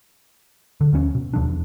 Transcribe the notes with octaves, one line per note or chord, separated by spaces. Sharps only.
D3
D#2 F3 C#4
B2
D#2 F3 D4
E2